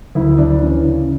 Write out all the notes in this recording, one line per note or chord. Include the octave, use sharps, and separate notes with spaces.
D2 E4
D2 D4
E3 C#4
C#3